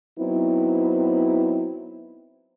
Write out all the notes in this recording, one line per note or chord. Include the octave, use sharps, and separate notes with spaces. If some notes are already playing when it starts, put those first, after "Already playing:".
F#3 B3 C4 D#4 E4